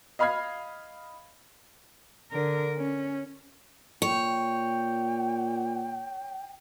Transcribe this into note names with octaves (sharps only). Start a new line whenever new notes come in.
D#5 F5 B5 F6 G#6 C7
D3 A#4
C#4
A#2 C#5 G5